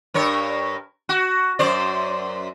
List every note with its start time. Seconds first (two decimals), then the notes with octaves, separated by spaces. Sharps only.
0.14 G2 A#4 C#5
1.09 F#4
1.59 F#2 C5 D5